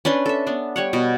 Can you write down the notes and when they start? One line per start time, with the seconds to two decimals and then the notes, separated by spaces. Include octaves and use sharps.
0.05 C#4 D4 B4 C6
0.26 A4 E5
0.47 B3 D4
0.76 G3 C#5 F#5
0.93 B2